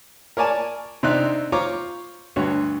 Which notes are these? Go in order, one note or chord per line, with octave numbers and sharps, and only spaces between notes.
A#4 C#5 D5 G#5 A5
C3 C4 D4 D#4 F#6
F4 C5 C#5 A#5 D6
D2 G2 F#4 C#5